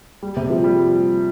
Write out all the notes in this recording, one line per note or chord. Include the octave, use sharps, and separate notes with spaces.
G3
C3
F3
G3